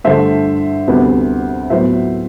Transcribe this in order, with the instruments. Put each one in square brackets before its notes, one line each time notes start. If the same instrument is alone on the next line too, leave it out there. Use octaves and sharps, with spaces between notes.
[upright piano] G2 D3 A3 C5 E5
D2 C3 G3 B3
A2 F#3 B3 C5 E5